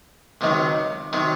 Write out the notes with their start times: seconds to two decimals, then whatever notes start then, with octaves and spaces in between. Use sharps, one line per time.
0.41 C#2 C3 D#3 F#3
1.13 C3 D#3 F#3